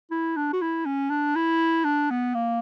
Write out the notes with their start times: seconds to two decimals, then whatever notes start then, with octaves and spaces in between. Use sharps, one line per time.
0.11 E4
0.37 D4
0.53 F#4
0.61 E4
0.86 C#4
1.10 D4
1.36 E4
1.84 D4
2.10 B3
2.35 A#3